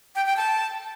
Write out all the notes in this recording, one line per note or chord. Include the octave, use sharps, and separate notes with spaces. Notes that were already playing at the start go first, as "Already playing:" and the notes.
G5
G5
A5